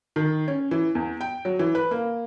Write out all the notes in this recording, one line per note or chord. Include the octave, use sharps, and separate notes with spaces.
D#3
C#4
E3
E2
G5
F#3
E3
B4
A#3